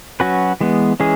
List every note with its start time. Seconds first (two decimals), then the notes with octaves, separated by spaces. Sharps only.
0.20 F#3 C#4 F#4 B4
0.61 E3 G#3 B3
1.00 E3 G#3 C#4 G#4